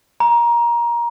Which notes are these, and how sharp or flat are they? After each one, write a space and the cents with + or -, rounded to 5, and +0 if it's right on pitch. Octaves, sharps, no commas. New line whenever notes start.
A#5 +20